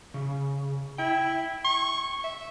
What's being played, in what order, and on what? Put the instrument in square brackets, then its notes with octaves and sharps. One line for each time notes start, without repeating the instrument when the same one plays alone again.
[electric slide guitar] C#3
[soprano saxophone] E4 [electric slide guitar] G5
[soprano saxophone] C#6
E5